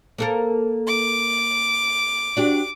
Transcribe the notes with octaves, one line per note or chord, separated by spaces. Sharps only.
A#3 A4 A#4
D6
D4 F#4 G4